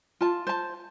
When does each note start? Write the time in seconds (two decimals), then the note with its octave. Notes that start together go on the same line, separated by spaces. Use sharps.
0.21 F4 A5
0.47 C5 A5